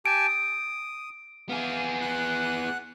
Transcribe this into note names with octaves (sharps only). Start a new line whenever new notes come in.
G4 G#5 A5 D7
D#6
B3 G#4 F5
F#5 F#6